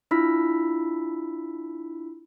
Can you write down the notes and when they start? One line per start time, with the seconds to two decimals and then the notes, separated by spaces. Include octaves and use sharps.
0.11 D4 E4 F4 B5 E6 B6